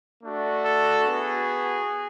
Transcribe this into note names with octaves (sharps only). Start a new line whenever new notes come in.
A3 D4 F#4
A4
B3 F#4 G#4